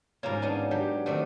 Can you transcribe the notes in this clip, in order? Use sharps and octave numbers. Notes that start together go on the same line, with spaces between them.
G#2 A#3 C#4 F4 A#4
B3 D4 D#4
F#3 G4
D#3 A3 C4 D5